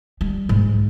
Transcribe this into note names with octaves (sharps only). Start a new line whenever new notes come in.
G3
G#2